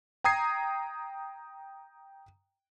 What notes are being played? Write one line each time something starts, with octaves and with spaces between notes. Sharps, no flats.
G5 A#5 D#6 G#6 C7